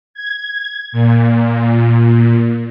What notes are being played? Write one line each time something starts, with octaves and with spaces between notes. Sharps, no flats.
G#6
A#2